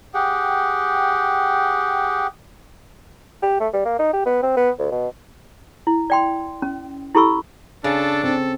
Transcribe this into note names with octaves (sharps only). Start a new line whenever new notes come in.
G4 G#4 F#5 G5
G4
A3
G3
A#3
D#4
G4
B3
C4
B3
D2
B2
E4
D5 G5 C6
C#4
E4 G4 A4 B5 C#6 E6
C#3 D4 A4
C4 A4